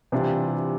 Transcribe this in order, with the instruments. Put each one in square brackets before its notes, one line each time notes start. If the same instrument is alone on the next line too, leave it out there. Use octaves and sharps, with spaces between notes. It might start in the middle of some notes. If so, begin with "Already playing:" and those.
[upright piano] C3 [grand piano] E3 G3 D4 F4